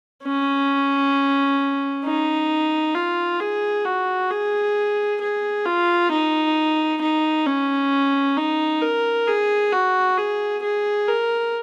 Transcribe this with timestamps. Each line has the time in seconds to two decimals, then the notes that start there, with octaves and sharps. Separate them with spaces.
0.23 C#4
2.04 D#4
2.95 F4
3.40 G#4
3.85 F#4
4.30 G#4
5.21 G#4
5.65 F4
6.11 D#4
7.01 D#4
7.46 C#4
8.37 D#4
8.82 A#4
9.27 G#4
9.72 F#4
10.17 G#4
10.62 G#4
11.08 A#4